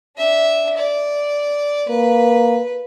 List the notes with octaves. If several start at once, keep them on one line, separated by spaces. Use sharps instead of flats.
D4 E5
D5
A#3 B4